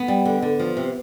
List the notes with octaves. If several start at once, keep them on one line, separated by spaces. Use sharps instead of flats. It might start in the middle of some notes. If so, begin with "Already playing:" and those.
Already playing: B3
G3
D3
D3
F3
C3